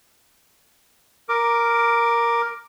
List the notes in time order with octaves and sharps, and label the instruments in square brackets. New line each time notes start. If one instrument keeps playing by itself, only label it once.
[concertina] A#4 D6